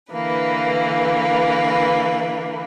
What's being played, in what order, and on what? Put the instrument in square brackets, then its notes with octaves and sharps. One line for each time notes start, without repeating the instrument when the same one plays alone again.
[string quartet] D3 E3 A#3 B4